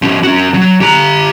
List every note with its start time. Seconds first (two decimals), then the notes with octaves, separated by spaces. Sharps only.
0.02 F3 C#4
0.24 C#4 F#4
0.54 F#3
0.81 G4 A#5